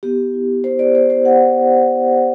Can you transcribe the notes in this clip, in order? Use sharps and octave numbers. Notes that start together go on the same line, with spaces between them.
B3 G4
E4
E4 C5
D5
B3 C5
C5
B3 F#5